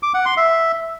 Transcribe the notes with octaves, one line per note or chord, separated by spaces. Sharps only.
D6
F#5
C6
E5